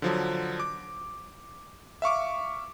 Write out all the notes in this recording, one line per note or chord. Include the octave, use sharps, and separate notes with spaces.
D3 F3 F#3
D6
E5 F5 C#6 D6